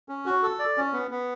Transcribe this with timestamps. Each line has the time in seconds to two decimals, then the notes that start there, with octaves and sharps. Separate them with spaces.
0.09 C#4
0.26 F#4
0.43 A4
0.59 D5
0.77 C#4
0.93 B3
1.11 B3